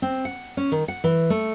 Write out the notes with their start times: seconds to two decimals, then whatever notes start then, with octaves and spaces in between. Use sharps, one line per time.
0.02 C4
0.25 F#5
0.57 C#4
0.72 D#3
0.88 F#5
1.04 E3
1.30 A3